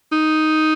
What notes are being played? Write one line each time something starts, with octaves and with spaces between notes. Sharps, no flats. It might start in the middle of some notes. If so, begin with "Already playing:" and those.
D#4